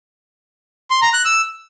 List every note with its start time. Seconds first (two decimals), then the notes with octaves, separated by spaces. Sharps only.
0.90 C6
1.02 A#5
1.13 F#6
1.25 E6